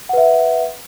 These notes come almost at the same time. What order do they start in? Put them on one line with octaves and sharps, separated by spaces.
F#5 B4 E5